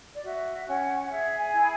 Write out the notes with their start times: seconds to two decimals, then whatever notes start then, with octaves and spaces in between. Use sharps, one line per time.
0.13 D5
0.25 F#4 E5
0.67 C#4 F#5
1.03 F#5
1.10 G#4 E5
1.38 G#5
1.53 E4
1.61 B5